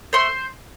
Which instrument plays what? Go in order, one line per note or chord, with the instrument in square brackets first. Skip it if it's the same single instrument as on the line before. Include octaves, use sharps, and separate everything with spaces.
[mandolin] A3 C5 C6